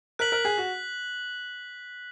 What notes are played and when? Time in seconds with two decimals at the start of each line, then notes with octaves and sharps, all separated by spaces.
0.19 A#4 F#6 B6 F#7
0.32 A#4
0.45 G#4
0.58 F#4